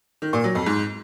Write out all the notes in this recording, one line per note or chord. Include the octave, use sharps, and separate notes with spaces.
D#3
A#2
F#3
F2
G#2